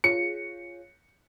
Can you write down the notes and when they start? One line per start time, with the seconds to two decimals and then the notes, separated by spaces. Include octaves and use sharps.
0.04 F4 G#4 C#5 C#7